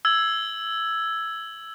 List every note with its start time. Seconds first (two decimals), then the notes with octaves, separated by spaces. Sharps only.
0.05 E6 G#6 F#7